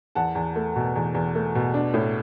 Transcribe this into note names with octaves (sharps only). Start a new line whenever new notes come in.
E2 F#5 A5
E2
A3
B2
E2
E2
A3
B2
D4
A2